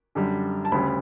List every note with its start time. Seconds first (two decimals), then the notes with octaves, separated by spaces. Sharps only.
0.15 F#2 D3 G3
0.65 A5
0.72 D2 C#3 G3 B5